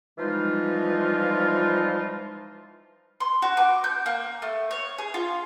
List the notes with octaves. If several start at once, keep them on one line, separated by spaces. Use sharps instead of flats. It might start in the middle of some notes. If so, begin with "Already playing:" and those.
E3 F3 G3 G#3 D#4 F4
C6
F#4
D6
G6
A#3
A3
C#5
G#4
F4